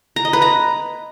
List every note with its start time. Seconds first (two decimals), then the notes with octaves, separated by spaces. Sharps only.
0.16 A#5
0.25 D#5
0.33 B4
0.42 A#5